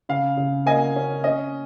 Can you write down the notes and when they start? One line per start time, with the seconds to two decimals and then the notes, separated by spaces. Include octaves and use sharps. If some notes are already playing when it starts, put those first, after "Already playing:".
0.09 C#3 F5
0.37 C#3
0.66 A#3 D#5 G#5
0.96 C#4
1.24 C#4 D#5